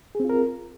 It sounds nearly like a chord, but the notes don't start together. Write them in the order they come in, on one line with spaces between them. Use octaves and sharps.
G#4 C4 F4 A#4